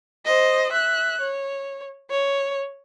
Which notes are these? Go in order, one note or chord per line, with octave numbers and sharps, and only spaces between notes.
C5 D#5
E5 F#6
C#5
C#5